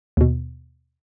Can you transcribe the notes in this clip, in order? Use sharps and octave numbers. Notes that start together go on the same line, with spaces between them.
D#2 B2